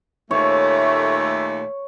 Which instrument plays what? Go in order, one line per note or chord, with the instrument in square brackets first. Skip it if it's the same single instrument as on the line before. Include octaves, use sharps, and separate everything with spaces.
[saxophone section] D#2 A#2 A3 [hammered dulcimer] C#5